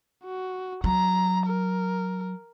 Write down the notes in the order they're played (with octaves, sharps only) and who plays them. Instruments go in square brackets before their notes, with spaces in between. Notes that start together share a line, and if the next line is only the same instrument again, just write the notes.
[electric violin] F#4
[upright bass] F#3 [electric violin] A#5
[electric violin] A#4